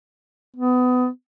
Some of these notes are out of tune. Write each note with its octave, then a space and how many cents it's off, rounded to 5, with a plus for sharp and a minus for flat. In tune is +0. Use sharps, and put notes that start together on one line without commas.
B3 +25